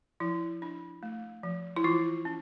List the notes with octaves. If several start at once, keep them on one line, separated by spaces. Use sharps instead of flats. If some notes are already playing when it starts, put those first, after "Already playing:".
F3 E4
D4
A3
F3
E4
E3 F4
C#4